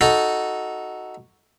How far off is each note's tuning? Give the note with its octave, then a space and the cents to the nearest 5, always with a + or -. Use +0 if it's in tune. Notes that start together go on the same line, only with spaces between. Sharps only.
D#4 +5 F#4 +0 A4 -5